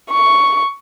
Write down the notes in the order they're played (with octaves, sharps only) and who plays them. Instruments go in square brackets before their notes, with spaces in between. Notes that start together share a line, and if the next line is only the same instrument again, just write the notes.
[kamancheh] C#6